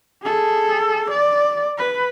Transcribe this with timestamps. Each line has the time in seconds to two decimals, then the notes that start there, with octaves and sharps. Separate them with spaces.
0.23 G#4 A4
1.11 D5
1.78 B4